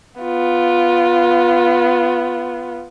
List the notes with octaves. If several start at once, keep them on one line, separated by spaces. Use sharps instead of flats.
B3 F4